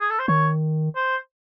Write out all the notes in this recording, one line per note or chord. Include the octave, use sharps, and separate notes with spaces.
G#4
A4
C5
D#3 C#5
C5